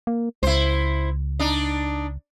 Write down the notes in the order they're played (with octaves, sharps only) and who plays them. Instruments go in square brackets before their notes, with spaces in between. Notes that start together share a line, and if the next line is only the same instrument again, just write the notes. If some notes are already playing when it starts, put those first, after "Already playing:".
[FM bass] A#3
[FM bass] C#2 [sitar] E4 C5
[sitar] D4 D#4